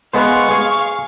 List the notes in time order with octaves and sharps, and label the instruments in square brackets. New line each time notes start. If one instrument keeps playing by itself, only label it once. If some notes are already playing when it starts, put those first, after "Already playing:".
[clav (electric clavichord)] G#3 B3 C5 [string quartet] F5 C#6
[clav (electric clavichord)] G#4